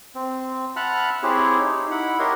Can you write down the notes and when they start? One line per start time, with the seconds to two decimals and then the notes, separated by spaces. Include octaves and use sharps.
0.15 C4
0.76 E5 F#5 A5 B5 F6 F#6
1.23 C4 E4 G4 G#4 C5 C#5
1.58 D#4
1.91 E4 F#5 B5
2.19 G4 A#4 C#5 D#5 F#5 C6